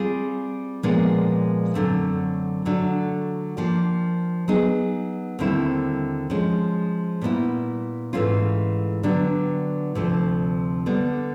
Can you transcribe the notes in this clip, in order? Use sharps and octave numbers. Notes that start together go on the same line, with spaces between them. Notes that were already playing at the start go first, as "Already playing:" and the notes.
Already playing: G3 C4 F4 G#4
A#2 F3 G#3 B3 D4
F#2 D3 F#3 A3 C4
D3 F#3 A3 D4 F#4
F3 A#3 D4 G4
F#3 B3 D#4 G#4
D#2 D3 G3 C4 E4
F3 G#3 C#4
A#2 G3 B3 E4
G#2 E3 A3 C#4 F4
D3 F#3 B3 D4 G4
D2 C3 F3 A3
D3 G3 B3